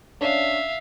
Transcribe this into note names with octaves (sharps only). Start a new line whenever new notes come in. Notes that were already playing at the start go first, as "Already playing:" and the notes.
C#4 D4 E5 F5